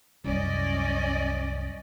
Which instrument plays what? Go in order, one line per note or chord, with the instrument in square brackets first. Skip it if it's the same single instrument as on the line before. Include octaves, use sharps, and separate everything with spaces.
[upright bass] C2 F#2 [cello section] C#4 D5 D#5